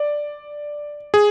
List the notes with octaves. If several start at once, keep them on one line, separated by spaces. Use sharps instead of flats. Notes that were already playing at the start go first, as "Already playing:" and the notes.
Already playing: D5
G#4